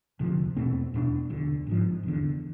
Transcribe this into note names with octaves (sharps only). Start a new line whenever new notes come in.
E1 D2 C3 F3
E2 B2 A3 C4
E2 B2 A3 D4
E1 D2 D3
G#1 G#2 F3
F1 E2 D3